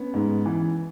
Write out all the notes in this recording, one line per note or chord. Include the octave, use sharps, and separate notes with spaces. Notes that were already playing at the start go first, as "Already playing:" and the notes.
Already playing: B3 C#4
G#2
E3